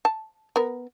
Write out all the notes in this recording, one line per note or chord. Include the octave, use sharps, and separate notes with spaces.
A5
B3 A#4